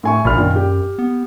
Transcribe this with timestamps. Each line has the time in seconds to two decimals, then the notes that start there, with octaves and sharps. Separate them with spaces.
0.03 A2 G#5 C#6
0.25 A#1 A#2 B5 F6
0.37 F#2 A#2 D#3
0.56 G4
0.99 B3